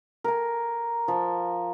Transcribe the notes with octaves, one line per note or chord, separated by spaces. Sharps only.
A#4 G#5
F3